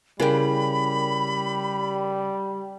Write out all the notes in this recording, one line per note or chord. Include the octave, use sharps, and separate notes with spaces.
C#3 G3 E4 A#4 G5 B5